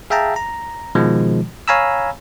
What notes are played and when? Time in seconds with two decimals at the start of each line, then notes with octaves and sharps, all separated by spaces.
0.10 G#4 E5 F5 G5 A5 A#5
0.36 A#5
0.95 B2 D#3 F3 G#3
1.68 C#5 F5 G#5 A#5 B5 E6